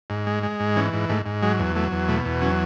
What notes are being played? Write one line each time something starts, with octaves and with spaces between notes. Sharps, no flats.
G#2
G#3
G#3
G#2
E3 C#4
G#2
G#2 A3
G#2
F#3 G#3
E2
F#3 A3
E2
B2 A3
E2
F#3 C#4